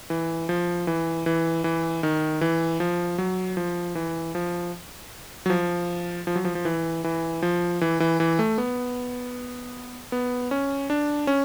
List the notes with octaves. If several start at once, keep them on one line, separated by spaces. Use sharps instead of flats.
E3
F3
E3
E3
E3
D#3
E3
F3
F#3
F3
E3
F3
F#3
F3
F3
F#3
F3
F3
E3
E3
F3
E3
E3
E3
A3
B3
B3
C#4
D4
C#4